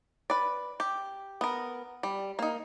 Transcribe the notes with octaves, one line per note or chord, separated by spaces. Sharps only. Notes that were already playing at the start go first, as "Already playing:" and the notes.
B4 D5
G4
B3 A#4
G3
A#3 D#4